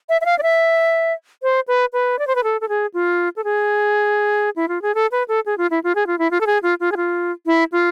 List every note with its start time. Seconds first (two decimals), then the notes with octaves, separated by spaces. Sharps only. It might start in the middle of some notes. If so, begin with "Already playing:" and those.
0.09 E5
0.21 E5
0.25 F5
0.39 D5
0.43 E5
1.43 C5
1.68 B4
1.93 B4
2.19 D5
2.27 C5
2.35 B4
2.44 A4
2.61 A4
2.69 G#4
2.94 F4
3.36 A4
3.44 G#4
4.56 E4
4.68 F4
4.82 G#4
4.95 A4
5.12 B4
5.28 A4
5.46 G#4
5.58 F4
5.71 E4
5.84 F4
5.95 G#4
6.07 F4
6.19 E4
6.31 F4
6.41 A4
6.47 G#4
6.63 F4
6.80 F4
6.92 G#4
6.97 F4
7.46 E4
7.72 F4